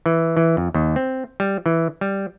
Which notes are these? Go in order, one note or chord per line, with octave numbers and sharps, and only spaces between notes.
E3
E3
F2
D#2
C4
G3
E3
G3